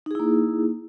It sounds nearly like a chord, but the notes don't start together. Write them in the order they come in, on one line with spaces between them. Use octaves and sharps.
D#4 G#4 E4 A#3